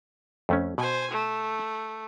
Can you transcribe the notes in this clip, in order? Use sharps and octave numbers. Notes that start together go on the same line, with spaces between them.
F2 A3 C#4
B2 C5 G#5
A3